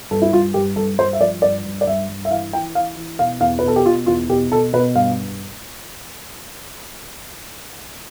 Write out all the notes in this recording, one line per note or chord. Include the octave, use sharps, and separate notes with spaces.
G2 A4
E4
G2 F4
G2 G4
G2 A4
G2 C5
E5
F3 D5
G2 D5
G2
D5
G2 E5
G2
E5
E3 F5
E3 G5
E3 F5
E3
B2 F5
E2 F5
B4
B2 A4
G4
B2 F4
E2 F4
B2 G4
B2 A4
B2 B4
G2 F5